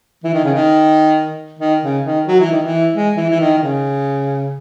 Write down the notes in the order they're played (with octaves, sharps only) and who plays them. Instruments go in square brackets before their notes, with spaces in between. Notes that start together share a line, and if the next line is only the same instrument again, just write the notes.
[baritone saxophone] E3
D#3
C#3
D#3
D#3
C#3
D#3
F#3
E3
D#3
E3
G#3
E3
E3
D#3
D#3
C#3